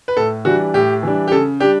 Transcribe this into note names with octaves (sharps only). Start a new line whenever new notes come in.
B4
A2 A4
E3 G3 D4 F#4
A2 G4
E3 G3 D4
G4
C#3 A4
G3 D4 G4